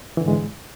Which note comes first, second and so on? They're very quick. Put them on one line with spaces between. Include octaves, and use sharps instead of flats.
E3 D3 G#2 G#3